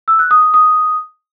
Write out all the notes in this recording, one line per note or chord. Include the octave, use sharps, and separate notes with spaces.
E6
F#6
D#6
D#6
D#6